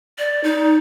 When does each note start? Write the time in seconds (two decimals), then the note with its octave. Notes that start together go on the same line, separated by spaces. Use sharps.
0.18 D5
0.44 D#4